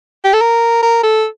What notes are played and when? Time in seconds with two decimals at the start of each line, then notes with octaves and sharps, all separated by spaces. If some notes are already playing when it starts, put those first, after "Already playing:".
0.25 G4
0.33 A4
0.41 A#4
0.83 A#4
1.04 A4